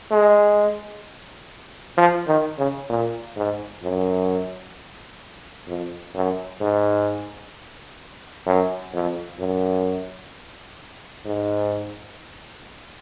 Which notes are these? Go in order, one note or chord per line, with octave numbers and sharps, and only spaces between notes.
G#3
F3
D#3
C#3
A#2
G#2
F#2
F2
F#2
G#2
F#2
F2
F#2
G#2